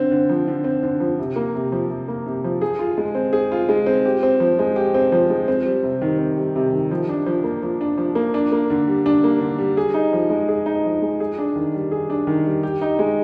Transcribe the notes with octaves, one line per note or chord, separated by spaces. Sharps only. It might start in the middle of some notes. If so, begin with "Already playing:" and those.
Already playing: D3 C4
D3
F3
D3
C4
D3
F3
C3
A#3
C3
F3
C3
A#3
C3
F3
G#4
F4
G#3
C4
G#4
F4
G#3
C4
G4
C4
F3
G#3
G4
C4
F3
G#3
C4
G3
C3
D#3
C4
G3
C3
D#3
F3
D4
F3
A#3
F3
D4
F3
A#3
D4
A#3
D3
G3
D4
A#3
D3
G3
G#4
D#4
F3
G#3
G#4
D#4
F3
G#3
G#4
D4
D#3
G3
G#4
D4
D#3
G3
G4
D#4
G#3